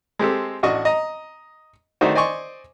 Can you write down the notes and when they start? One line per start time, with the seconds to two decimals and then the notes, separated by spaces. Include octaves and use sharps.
0.19 G#3 C4 G4 A4
0.63 A1 D4 F#4 D#5 C#6 D#6
0.85 D#5 A#5
2.01 D#3 A3 D4 D#4 F#4 C5
2.15 C5 D5 D#5 G#5 C6 C#6